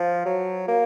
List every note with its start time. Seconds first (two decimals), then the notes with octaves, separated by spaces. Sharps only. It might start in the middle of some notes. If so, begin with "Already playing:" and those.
Already playing: F3
0.26 F#3
0.68 A#3